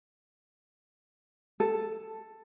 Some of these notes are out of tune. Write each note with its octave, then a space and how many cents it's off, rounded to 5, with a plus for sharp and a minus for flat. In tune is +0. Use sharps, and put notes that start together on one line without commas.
A4 +5